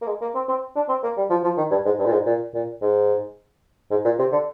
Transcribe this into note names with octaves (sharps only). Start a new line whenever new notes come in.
A#3
G#3
A#3
C4
C4
D4
C4
A#3
G3
F3
F3
D#3
G2
G#2
G2
A#2
G#2
A#2
A#2
G#2
G#2
A#2
C3
D3